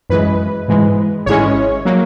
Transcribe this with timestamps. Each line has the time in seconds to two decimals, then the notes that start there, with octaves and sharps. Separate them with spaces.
0.10 F#2 E3 G#3 B4
0.68 G#2 E3 G#3
1.26 G#1 G#2 E3 G#3 C#4 C#5
1.85 F#3 A#3